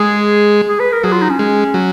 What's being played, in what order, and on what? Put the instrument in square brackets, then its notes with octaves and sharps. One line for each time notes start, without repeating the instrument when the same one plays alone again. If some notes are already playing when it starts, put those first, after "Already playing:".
Already playing: [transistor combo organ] G#3 [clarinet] G#4
[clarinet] G#4
B4
A#4
[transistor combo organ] F#3 [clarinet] G#4
[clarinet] F4
D#4
C#4
[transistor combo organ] G#3
F#3